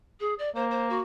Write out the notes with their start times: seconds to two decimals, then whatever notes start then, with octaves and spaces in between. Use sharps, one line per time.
0.20 G#4
0.39 D5
0.55 A#3 C5
0.71 C5
0.90 F#4